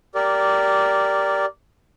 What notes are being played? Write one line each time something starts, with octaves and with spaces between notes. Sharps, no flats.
G4 A#4 D5